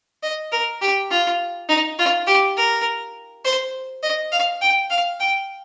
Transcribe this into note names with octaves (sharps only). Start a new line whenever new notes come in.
D#5
A#4
G4
F4
D#4
F4
G4
A#4
C5
D#5
F5
G5
F5
G5